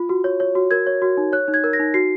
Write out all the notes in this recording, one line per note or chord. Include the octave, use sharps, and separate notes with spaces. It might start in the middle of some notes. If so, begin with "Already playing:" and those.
Already playing: F4
F#4
C#5
C#5
F#4
A#4 G#6
C#5
F#4
D#4
C#5 F#6
D#4
G#6
A#4
A#6
D#4
F#4 C7